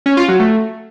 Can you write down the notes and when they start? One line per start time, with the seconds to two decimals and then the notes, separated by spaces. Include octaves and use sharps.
0.06 C#4
0.17 F4
0.28 F#3
0.40 A3